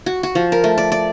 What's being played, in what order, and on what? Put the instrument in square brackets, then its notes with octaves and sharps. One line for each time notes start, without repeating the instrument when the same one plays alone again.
[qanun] F#4
F#4
F3
A#4
A3
D5
D5